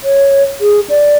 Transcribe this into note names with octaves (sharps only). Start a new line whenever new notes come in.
C#5
G#4
D5